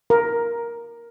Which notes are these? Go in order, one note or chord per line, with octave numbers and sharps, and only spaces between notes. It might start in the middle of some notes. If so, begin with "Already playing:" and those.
A#4